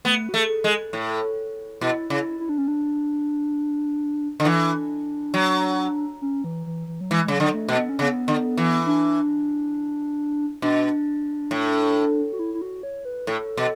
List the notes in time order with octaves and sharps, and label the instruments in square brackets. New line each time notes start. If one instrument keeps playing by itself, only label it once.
[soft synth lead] A3 [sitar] B3
[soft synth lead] F#4
[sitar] A3 [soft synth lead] G#4
[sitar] G#3
A2
[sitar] B2 [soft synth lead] E4
[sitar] C#3 [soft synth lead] E4
[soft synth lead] E4
D4
C#4
D4
[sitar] D3
[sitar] E3 [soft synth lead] D4
[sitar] F#3
[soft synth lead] C#4
E3
E3
E3
F#3
[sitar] E3 [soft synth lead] G#3
[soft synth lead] G#3
[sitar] C#3 [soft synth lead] F#3
[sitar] D3
[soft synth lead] A3
[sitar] B2
[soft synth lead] B3
C#4
[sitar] C#3 [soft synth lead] B3
[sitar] D3
E3
[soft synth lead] D4
[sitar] B2 [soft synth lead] D4
[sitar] A2
[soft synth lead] F#4
E4
E4
F#4
C#5
B4
[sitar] A2 [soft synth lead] A4
[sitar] B2